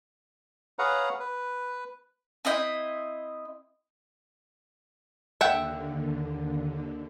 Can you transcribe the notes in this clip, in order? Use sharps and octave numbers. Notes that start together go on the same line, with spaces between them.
G#4 B4 C#5 F5 F#5 A#5
B4
C4 E4 D#5 G5
D#2 D3 E5 F#5 G5